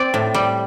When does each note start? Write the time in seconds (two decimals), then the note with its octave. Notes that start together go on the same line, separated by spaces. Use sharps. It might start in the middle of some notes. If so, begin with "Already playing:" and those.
Already playing: C4 D5
0.14 A2
0.34 G3